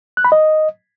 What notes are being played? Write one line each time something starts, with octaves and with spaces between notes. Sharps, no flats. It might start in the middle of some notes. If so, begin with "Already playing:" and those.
F#6
B5
D#5